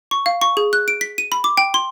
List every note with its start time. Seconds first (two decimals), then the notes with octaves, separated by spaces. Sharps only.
0.11 C#6
0.26 F5
0.41 C#6
0.57 G#4
0.73 F#6
0.88 D7
1.01 B6
1.18 D#7
1.32 B5
1.44 D6
1.57 G5
1.74 C6